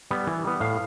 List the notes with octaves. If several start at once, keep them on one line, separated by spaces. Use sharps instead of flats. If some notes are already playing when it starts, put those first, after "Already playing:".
G3 B3
E3
G3 B3
A2 F5